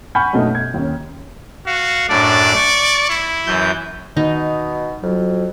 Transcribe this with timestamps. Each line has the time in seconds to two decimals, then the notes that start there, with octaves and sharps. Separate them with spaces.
0.15 F#5 G#5 B5 C#6 F6 G6
0.33 F#2 B2 A3 B3 D#4
0.55 G#6
0.74 D#2 C#4
1.66 F#4 F5
2.09 F#2 A2 D4 D5
2.55 C#6
3.09 E4
3.46 F#2 E3 G6
4.17 B2 D#3 D#4
5.03 F2 F#3